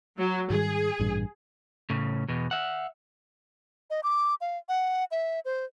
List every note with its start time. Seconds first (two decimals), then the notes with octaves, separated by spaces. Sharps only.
0.17 F#3
0.50 G#2 D#3 G3 G#4
0.99 A1 G2 A#2
1.90 A2 C#3
2.28 E2 B2
2.51 E5 F#5
3.90 D#5
4.03 D6
4.41 F5
4.69 F#5
5.11 E5
5.45 C5